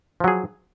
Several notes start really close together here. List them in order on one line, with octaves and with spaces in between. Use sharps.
F3 F#3 G#4